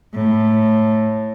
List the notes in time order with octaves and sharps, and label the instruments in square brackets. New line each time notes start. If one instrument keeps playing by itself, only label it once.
[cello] A2